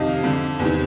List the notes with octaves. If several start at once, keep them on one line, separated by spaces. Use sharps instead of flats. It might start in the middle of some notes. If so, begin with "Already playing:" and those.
Already playing: F2 C3 D#3 D#5 F5
F2 D3
E2 C3 D#3